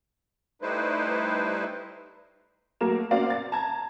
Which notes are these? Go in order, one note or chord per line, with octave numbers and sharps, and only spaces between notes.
G3 A3 D#4 E4 B4 C5
F#3 A3 A#3 A#4 E7
A#3 C4 C#4 F#4 D5 F5
A6
A5 A#5 G#6